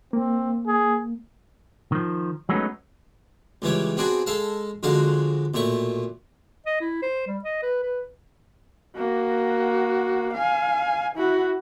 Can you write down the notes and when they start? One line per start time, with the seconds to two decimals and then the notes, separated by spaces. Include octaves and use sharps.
0.13 A#3 C4
0.67 G#4
1.92 D#3 F3
2.49 F#3 G#3 A3 B3 C#4 D#4
3.62 C#2 E3 G3 C#5
3.97 B3 C4 D4 F#4 G#4
4.26 G#3 A4 F5 A5
4.83 F2 D3 G#3 F#4 F5
5.54 B1 A#2 A3 C#6
6.66 D#5
6.81 E4
7.02 C5
7.27 G3
7.44 D#5
7.63 B4
7.83 B4
8.96 A#3 F#4
10.33 F5 G#5
11.16 E4 F#4